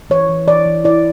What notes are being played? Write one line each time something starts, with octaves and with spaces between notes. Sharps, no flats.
E3 C#5
E3
E3 D5
E3
E4 D5